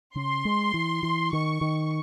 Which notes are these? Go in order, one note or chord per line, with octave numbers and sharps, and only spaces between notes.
C#3 C6
G#3
E3
E3
D#3 C#6
D#3